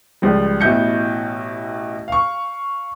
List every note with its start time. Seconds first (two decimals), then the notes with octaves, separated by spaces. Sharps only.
0.22 C#2 F3 G3
0.61 A1 B2 E4 G6 C#7
2.08 F5 C#6